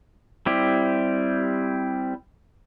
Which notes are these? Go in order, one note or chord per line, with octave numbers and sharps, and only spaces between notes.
G3 C4 E4 G4